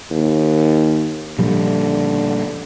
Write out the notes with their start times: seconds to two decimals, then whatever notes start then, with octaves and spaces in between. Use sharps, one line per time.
0.11 D#2
1.38 A#2 D3 F3 G3